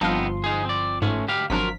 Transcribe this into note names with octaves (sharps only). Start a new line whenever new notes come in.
G1 F3 B3 C4 D#4 A5 C6 F6
D#4 G#4
C4 D5
G#2 A3 C#4
D2 G4 F5
G#1 F3 F#3 D4 F4 A#4 B6